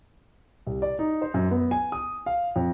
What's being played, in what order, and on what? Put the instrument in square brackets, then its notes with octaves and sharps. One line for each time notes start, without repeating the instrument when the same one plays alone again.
[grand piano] C2
D5
D#4
C5
F#2
B3
G#5
D#6
F5
F2